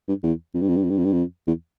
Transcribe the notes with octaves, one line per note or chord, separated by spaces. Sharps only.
G2
E2
F2
G2
F2
G2
F2
G2
F2
G2
F2
E2